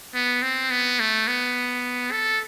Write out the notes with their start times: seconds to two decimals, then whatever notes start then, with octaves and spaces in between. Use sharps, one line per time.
0.15 B3
0.42 C4
0.71 B3
1.00 A3
1.28 B3
2.12 A4